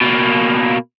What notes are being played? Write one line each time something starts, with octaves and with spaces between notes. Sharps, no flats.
B2 A#3